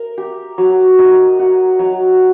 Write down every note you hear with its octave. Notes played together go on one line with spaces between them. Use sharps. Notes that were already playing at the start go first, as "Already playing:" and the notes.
Already playing: A#4
G4
F#3
D#4
F#4
F#3